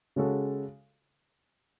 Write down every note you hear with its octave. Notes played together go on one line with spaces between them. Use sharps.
C#3 G#3 C#4 F#4 A4